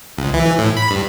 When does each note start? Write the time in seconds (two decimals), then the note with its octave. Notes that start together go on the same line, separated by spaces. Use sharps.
0.18 C#2
0.34 E3
0.58 A2
0.77 B5
0.90 G2